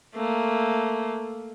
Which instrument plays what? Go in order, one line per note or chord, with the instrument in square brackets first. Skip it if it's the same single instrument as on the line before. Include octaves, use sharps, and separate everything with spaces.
[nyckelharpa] A3 A#3